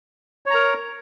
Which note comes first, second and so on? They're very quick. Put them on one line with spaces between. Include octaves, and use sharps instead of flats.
C#5 A#5 A#4